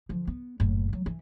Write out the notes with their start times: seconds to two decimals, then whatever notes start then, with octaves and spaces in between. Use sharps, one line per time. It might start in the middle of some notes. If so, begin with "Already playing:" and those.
0.09 D3 F3
0.27 B3
0.60 F#1 A2
0.93 F#3
1.06 E3